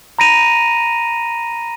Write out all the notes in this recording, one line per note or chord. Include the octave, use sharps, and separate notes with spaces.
A#5 B5 A#6 D7 D#7 F7